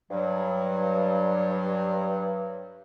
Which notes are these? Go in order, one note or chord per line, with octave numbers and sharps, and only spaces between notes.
G2 F#3